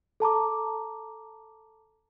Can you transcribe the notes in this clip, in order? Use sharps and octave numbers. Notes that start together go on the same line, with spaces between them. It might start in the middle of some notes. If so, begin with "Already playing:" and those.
A4 A5 A#5 D6